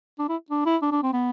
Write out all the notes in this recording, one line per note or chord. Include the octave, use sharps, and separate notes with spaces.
D4
E4
D4
E4
D4
D4
C4
B3